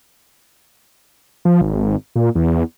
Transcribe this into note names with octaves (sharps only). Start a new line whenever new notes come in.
F3
G#1
A#2
E2